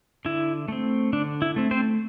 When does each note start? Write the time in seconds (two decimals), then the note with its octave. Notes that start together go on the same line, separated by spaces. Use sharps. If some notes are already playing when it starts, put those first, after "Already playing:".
0.25 D3 E4
0.68 A3 C4
1.13 D3 D4
1.42 E4
1.56 A3 C4
1.71 C4 C5